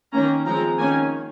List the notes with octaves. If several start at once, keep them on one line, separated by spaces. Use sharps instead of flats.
D#3 A#3 C#4 A#5
F3 G#3 C4 A#5
D#3 A#3 C#4 G#5